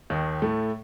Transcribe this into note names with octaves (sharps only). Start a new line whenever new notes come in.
D#2 D#3
A2 A3